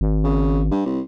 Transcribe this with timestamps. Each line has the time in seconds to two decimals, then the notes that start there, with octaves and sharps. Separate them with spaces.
0.01 G#1
0.24 C#3
0.71 G2
0.86 C2